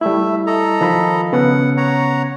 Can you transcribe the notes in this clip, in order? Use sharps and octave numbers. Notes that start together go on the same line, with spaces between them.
G3 A3 E4 E5
A4 D#5 A#5
D#3 F3 B5
C#3 B3 C#4 F#5
C#5 F#5 A#5